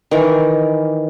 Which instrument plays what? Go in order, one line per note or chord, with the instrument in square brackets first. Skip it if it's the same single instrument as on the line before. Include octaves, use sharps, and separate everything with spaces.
[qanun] D#3 E3